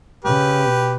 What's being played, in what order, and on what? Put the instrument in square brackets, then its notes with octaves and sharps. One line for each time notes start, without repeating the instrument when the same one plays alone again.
[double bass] C#3 [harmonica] G4 B4
[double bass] B2